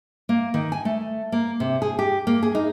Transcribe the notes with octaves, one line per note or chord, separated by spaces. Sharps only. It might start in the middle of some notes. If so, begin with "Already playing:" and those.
A#3
D#3
G#5
A3
A#3
C3
G#4
G4
A#3
G#4
D#4